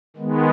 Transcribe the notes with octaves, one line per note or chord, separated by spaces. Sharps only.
D#3 G#3 B3